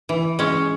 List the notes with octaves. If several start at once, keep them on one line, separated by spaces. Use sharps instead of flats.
E3
G#3 C#4